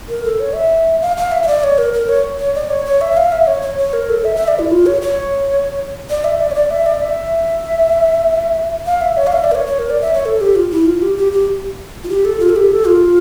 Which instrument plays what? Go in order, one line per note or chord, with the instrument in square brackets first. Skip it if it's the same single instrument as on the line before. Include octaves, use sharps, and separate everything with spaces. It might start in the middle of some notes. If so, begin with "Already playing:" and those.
[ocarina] A#4
A4
C#5
E5
F5
F5
E5
E5
D5
C#5
A#4
A#4
C#5
C#5
D5
C#5
C#5
E5
F5
E5
C#5
C#5
C#5
A#4
A4
E5
E5
D5
E4
F4
C#5
C#5
D5
E5
D5
C#5
D5
E5
D5
E5
F5
E5
C#5
F5
E5
D5
A#4
C#5
C#5
A#4
D5
E5
C#5
A4
G4
F4
E4
F4
G4
G4
G4
F4
G4
A4
F4
A4
G4
A4
F4